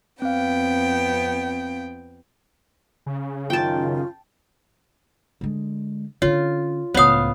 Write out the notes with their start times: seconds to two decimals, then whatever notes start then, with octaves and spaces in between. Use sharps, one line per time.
0.22 F2 B3 C4 F5 G5
3.06 C#3
3.50 F#2 D#3 F4 G5 A5
5.41 D3 G#3
6.22 D3 C#4 F4 C#5
6.94 C#2 A2 B3 C5 C#5 F5 D#6